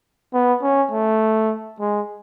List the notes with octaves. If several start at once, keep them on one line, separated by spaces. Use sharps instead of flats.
B3
C#4
A3
G#3